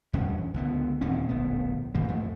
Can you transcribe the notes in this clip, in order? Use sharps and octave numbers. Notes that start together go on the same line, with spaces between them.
E2 G2 C#4
C#2 D3 B3
D#2 A#2 C4 C#4
D1 A#1 B3
A1 G2 D#3 A#3
F2 A3